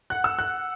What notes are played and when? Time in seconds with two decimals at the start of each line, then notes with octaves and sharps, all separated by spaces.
0.10 F#5 F#6
0.24 E6
0.39 F#6